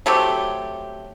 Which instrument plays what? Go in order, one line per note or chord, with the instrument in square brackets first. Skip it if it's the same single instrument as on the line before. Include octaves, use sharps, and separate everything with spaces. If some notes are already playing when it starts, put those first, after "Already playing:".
[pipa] F#3 A3 C4 G4